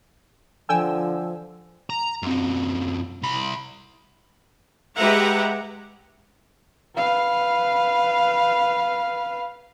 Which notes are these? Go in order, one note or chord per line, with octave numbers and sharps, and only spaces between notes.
D3 F3 G5 G#5 E6
A#5
F#2 C4
C2 B5
G#3 G4 B4 E5 F#5 A#5
B4 F5